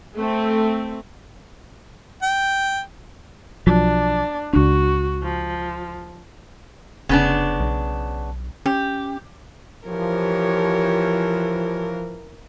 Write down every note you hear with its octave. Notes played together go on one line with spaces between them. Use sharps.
A3 C4
G5
B1 F3 F#3 D4
C#2 D4 F#4
F3
F1 C#3 B3 D4
B1
C#4 G4
E3 F3 G4 A#4 C#5